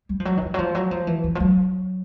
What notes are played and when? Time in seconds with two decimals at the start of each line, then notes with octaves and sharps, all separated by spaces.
0.09 G3
0.20 F3
0.25 F#3
0.37 D#3
0.42 E3
0.54 F#3
0.59 F3
0.75 F#3
0.91 F3
1.07 E3
1.24 E3
1.35 F3
1.40 F#3